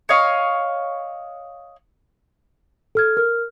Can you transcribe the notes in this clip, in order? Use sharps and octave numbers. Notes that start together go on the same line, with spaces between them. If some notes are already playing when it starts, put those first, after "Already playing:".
C#5 D#5 F5 C#6
A4 F6 G#6
A#4 F6